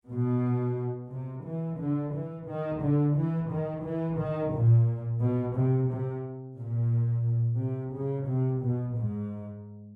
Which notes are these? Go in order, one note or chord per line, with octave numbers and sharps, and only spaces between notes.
B2
C3
E3
D3
E3
D#3
D3
E3
D#3
E3
D#3
A#2
B2
C3
C3
A#2
C3
C#3
C3
B2
G#2